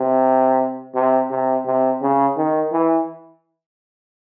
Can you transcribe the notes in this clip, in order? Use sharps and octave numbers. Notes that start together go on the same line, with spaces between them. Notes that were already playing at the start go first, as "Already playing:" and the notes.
Already playing: C3
C3
C3
C3
C#3
D#3
E3